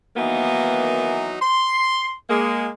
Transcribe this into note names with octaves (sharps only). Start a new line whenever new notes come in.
D#3 E3 F#3 A#3 B3 D#4
C6
G#3 A#3